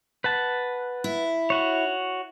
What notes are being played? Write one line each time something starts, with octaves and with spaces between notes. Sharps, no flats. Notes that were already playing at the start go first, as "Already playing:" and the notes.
B4 F#5 A5
E4
F#4 C#5